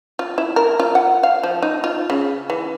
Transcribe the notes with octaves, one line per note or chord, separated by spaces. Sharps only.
F4
E4
A#4
F4
F#5
F5
F3
D#4
F4
C#3
E3